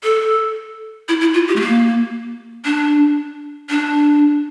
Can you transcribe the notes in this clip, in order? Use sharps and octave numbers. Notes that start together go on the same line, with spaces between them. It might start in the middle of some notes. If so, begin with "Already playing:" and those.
A4
E4
E4
F4
G4
A3
A#3
D4
D4